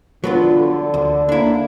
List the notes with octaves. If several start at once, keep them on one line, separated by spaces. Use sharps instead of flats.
D3 F#3 B3 F4
A4
D2
A#3 D4 E4